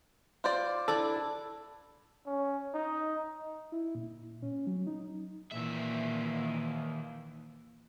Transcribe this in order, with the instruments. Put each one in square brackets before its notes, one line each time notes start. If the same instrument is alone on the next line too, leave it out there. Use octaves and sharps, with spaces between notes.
[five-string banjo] F4 C5 D5
[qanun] D4 E4 D6 [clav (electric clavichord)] A4
[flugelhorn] C#4
D#4
[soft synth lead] E4
A#2
C#4
F#3
D#4
[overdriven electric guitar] D#2 E5 [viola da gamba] A#2 D#3 E3